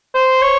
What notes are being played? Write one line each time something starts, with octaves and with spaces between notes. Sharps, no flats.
C5
C#5